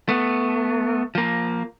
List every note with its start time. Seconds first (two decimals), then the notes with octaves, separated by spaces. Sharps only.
0.09 A3 B3
1.15 F3 A#3